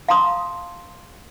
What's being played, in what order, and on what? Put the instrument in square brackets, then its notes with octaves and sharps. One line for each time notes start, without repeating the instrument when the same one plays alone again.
[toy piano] F5 A5 A#5 C6 D#6